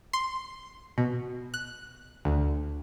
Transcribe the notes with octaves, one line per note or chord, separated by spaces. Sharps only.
C6
B2
F#6
D2